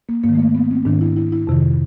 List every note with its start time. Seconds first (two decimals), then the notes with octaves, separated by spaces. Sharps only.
0.09 A#3
0.24 G#2 A#3
0.29 D#3
0.35 A3
0.39 A#3
0.55 B3
0.71 C4
0.85 G#2 D#3 D4
1.01 E4
1.16 E4
1.32 E4
1.47 F2 C3 D#3